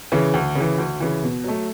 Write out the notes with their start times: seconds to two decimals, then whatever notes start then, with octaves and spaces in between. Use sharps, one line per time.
0.12 C#3 E3
0.34 D2
0.55 C#3
0.60 E3
0.78 D2
1.00 C#3 E3
1.23 B2
1.44 F#3 A3